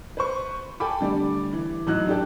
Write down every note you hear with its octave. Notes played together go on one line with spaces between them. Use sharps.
B4 C5 C#6
A4 G5 G#5 B5 D6
D3 G3 A3 D5
E3
A1 A2 F#3 D#4 D#5 F#6
A2 D4 G4 A4 G5